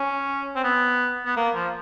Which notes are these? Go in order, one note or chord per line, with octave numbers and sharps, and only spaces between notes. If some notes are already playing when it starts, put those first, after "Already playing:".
Already playing: C#4
C4
B3
B3
A#3
F3